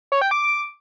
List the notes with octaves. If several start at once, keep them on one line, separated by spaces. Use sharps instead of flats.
C#5
G5
D6